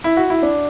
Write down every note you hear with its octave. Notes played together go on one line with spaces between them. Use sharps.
E4
F#4
E4
D4